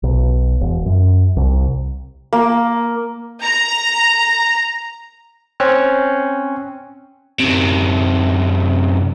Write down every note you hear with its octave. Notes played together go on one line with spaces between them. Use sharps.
B1
E1
F#2
C2
A#3
A#5
C4 C#4 C5 C#5 G5 F#6
F#2 C3